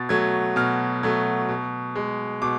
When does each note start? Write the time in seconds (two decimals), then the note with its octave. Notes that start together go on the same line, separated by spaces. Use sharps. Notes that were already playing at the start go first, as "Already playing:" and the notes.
Already playing: B2 A6
0.09 F#3 A3 G#6
0.56 B2 F6
1.03 F#3 A3
1.49 B2
1.95 G#3
2.42 B2 D6